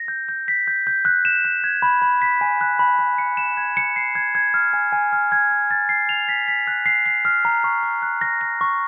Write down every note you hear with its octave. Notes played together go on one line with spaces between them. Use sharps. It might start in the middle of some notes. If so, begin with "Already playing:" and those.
Already playing: A#6
G6
G6
B6
G6
G6
F#6
E7
F#6
G#6
B5
B5
B6
G#5
F#6
B5
B5
C#7
E7
G#6
C#7
C7
G#6
G#6
F6
G#5
G#5
F6
G#6
F6
A6
C7
F7
B6
B6
F#6
C7
C7
F6
A#5
C#6
C#6
F#6
A#6
A#6
C#6